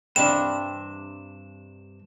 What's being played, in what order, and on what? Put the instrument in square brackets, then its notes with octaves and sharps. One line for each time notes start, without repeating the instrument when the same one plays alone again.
[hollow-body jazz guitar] G2 C3 D4 [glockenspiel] E7